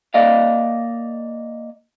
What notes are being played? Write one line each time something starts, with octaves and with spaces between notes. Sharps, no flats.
A#3 D5 D#5 F5